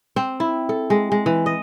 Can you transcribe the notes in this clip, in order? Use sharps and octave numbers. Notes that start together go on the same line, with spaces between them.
C4
E4
A4
G#3
G#3
E3
D#5